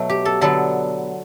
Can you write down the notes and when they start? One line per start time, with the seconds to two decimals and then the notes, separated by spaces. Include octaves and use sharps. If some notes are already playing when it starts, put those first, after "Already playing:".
Already playing: B2 F#3 A3
0.09 G4
0.25 A4
0.41 D3 F#3 B3 A4